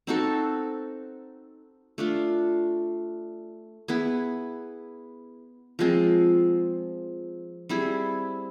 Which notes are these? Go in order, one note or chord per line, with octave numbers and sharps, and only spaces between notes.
C4 D#4 F#4 A4
A3 D4 F4
B3 E4 G#4 B4
F3 G#3 C4
G3 C4 E4 G#4